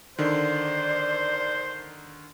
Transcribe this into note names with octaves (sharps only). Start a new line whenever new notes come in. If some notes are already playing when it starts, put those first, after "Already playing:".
D3 D#3 C5 D5